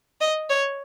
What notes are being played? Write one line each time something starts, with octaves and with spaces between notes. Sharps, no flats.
D#5
C#5